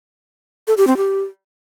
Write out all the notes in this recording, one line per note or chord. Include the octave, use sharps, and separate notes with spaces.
A4
G4
C4
G4